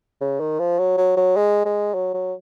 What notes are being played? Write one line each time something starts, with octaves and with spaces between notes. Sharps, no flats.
C#3
D#3
F3
F#3
F#3
F#3
G#3
G#3
F#3
F#3